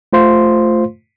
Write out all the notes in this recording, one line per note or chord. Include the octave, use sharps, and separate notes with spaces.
A3 F4 C5 F5 C6